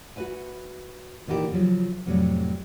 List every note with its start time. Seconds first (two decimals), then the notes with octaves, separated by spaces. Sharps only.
0.16 F#4 A4 B4 E5 G#5
1.27 A#2 D#3 E3 D#4 G4
1.52 C#3 F3 F#3
2.06 F2 A2 C3 D#3 F#3 G3